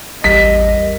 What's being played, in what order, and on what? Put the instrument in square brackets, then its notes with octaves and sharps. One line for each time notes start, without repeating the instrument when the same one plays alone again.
[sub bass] A1 [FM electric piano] E2 G3 A#4 [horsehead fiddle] D#5 [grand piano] B6